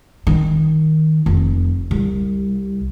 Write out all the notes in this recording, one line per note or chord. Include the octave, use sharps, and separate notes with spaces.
D#3
F1
C2